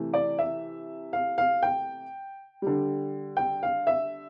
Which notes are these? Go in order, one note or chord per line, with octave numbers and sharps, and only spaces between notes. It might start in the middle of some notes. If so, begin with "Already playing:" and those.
Already playing: C3 E3 A3
D5
E5
F5
F5
G5
D3 G3
G5
F5
E5